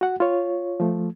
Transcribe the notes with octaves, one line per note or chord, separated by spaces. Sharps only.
F#4 F#5
F4 C#5
F3 A3